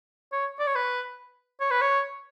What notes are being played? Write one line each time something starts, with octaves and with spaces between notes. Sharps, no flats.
C#5
D5
C#5
B4
C#5
B4
C#5